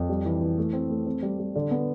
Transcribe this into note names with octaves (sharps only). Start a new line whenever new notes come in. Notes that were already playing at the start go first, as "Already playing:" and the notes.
Already playing: F2
G3
E3
E3
A3
C4
A3
C4
G3
G3
D3
B3